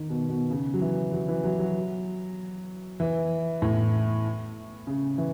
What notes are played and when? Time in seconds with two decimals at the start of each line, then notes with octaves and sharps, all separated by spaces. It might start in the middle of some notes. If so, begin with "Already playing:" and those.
Already playing: D#3
0.09 B2
0.29 B2
0.50 C#3
0.74 F#3
0.81 E3
1.13 F#3
1.28 E3
1.44 F#3
1.59 F#3
3.00 E3
3.62 A2
4.87 C#3
5.18 E3